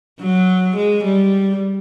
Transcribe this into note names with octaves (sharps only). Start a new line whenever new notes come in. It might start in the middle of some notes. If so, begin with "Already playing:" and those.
F#3
G#3
G3